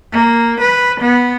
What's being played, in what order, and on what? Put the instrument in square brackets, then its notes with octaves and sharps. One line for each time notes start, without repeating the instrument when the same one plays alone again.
[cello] A#3
B4
B3